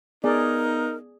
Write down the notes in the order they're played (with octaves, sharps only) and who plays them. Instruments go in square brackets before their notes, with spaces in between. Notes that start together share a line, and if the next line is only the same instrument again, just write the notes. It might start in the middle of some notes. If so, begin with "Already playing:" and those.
[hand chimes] B3 [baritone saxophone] D#4 [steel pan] G#4 D5 [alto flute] A#4